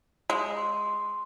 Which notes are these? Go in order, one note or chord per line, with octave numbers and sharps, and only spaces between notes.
G#3
C6